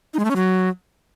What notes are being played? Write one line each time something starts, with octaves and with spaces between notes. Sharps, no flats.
D#4
G#3
A3
C#4
F#3